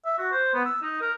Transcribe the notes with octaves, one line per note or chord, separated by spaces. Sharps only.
E5
F#4
C5
B3
E6
D#4
A#4